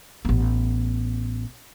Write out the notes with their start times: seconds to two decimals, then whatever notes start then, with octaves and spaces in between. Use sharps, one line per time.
0.25 A1 B3